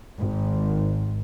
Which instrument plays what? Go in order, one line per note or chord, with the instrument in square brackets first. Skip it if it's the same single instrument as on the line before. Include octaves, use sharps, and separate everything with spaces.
[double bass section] G#1